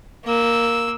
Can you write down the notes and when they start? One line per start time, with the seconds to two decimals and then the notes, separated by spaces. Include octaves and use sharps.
0.25 A#3 E6